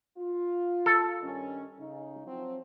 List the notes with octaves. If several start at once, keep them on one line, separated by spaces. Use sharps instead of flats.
F4
A4
G2 D#3 C#4
C#3 D#4
F3 F#3 C4